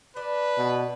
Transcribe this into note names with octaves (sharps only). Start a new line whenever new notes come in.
D4 B4
B2